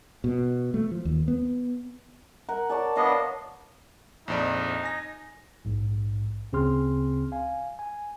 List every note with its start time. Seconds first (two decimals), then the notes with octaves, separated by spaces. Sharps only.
0.24 B2
0.74 A3
0.91 F3
1.05 D#2
1.28 B3
2.49 A#4 F#5
2.70 C#5 D5 A5
2.97 B3 D4 D#5 F5
4.28 A#1 F2 D#4 D5
4.83 G#5 A#6
5.65 A#1 G#2
6.53 D2 C#3 C4 G#4 C6 F6
7.32 F5 G#5
7.79 G#5